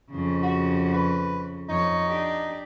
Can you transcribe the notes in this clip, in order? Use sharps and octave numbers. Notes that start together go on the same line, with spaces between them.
F2 C#3
F#4
B4
F2 D#4 C#5
D4 G4